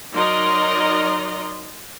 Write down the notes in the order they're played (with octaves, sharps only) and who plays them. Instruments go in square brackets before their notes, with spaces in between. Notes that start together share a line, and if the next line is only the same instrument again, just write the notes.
[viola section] F#3 D#4 A#4 D5 D#5 C6